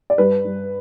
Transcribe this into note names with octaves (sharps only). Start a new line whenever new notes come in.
D5
G2 B4
G2